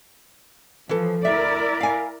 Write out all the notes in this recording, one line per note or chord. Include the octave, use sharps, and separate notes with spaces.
E3 F3 A4
D2 E4 A#4 D5 E5
F5 G#5